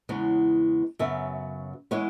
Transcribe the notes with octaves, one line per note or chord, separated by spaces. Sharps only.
E2 C#3 G#3 B3 C#5
F#2 C#3 F#3 B3 E5
E3 G#3 B3 C#5